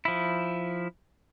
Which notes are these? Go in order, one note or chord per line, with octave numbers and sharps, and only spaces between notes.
F3 E4